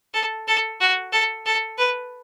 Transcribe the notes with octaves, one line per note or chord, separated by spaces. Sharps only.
A4
A4
F#4
A4
A4
B4